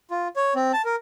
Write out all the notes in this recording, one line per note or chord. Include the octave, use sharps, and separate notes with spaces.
F4
C#5
C4
A5
A#4